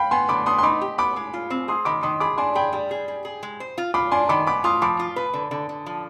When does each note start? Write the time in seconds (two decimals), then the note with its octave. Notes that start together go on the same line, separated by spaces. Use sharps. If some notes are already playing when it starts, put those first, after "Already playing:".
Already playing: F5 G5 B5
0.11 B3 G#5 C6
0.29 D3 B5 D6
0.46 B3 C6 D#6
0.58 C6
0.63 D#4 B5 D6
0.81 G4
0.98 B3 B5 D6
1.16 G#3
1.34 F4
1.50 C4
1.68 G#4 C6 D#6
1.85 D#3 B5 D6
2.03 D#3 C6 D#6
2.20 G#4 B5 D6
2.38 D4 G#5 C6
2.55 G#4 G5 B5
2.73 G3
2.91 G#4
3.08 G#4
3.25 G#4
3.43 G#3
3.60 C5
3.78 F4
3.94 F4 B5 D6
4.11 D4 G#5 C6
4.29 D#3 B5 D6
4.47 B3 B5 D6
4.64 F4 C6 D#6
4.82 F3 B5 D6
4.99 F4
5.16 B4
5.34 D3
5.51 D3
5.69 D3
5.86 F3